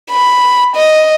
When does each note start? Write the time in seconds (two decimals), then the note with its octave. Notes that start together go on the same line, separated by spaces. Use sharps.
0.11 B5
0.76 D#5